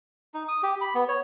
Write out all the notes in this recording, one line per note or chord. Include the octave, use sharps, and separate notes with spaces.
D#4
D#6
G4
B5
B3
C#5